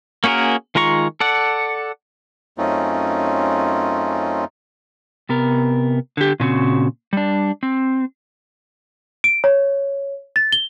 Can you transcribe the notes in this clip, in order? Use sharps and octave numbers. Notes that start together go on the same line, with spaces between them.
A#3 C#4 F#4 G#4 A#4
D#3 G#3 F4 A#5 C#6
A4 D5 F#5
F#2 A3 C4 C#4 D#4 F4
C3 B3 A#4
D3 G4
A#2 C#3 C4 F#4
G3 D4
C4
D7
C#5
A6
G7